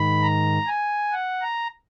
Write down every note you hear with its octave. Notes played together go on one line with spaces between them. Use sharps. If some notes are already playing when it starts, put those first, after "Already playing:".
Already playing: G#2 D#3 B5
A#5
G#5
F#5
A#5